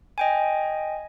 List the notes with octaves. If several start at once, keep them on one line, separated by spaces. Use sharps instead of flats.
D#5 G5 G#5